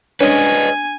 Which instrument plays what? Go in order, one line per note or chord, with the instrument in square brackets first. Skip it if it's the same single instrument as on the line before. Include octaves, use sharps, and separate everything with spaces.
[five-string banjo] G#3 C#4 [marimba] D4 [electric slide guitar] B4 D5 D#5 [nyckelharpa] G#5